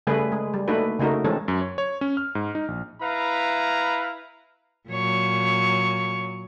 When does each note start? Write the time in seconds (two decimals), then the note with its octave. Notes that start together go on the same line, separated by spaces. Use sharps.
0.07 C#3 G3 A3 G#4 B4
0.32 G#3
0.54 G3
0.68 A3 A#3 D4 D#4 F#4 B4
0.99 C#3 A3 D#4 F#4 A#4
1.24 E3 G#3 A3 C4 C#4 A4
1.48 F#2
1.61 C#5
1.78 C#5
2.01 C#4
2.17 F6
2.35 G#2
2.55 D#4
2.68 A#1
3.01 E4 B4 F5 A#5
4.89 A#2 F#3 C#5